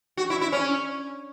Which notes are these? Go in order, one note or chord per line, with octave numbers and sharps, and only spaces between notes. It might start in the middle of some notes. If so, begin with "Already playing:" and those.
F#4
E4
E4
C#4